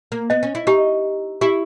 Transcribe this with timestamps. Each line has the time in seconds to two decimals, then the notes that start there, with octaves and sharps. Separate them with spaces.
0.12 A#3
0.30 B3 D#5
0.43 C#4
0.55 E4
0.67 D#4 G4
1.41 E4 G4